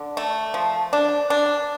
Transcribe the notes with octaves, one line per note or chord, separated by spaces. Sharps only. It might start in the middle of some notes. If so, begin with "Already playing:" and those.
Already playing: D3
A3
F3
D4
D4